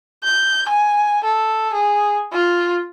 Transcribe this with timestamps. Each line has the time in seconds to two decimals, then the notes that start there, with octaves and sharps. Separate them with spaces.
0.23 G6
0.69 G#5
1.24 A4
1.73 G#4
2.33 F4